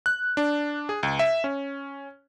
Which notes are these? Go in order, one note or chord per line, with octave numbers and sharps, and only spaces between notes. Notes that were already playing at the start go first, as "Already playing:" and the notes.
F#6
D4
G#4
C#2
E5
C#4